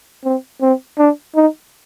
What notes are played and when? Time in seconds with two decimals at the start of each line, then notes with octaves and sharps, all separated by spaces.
0.25 C4
0.62 C4
0.99 D4
1.36 D#4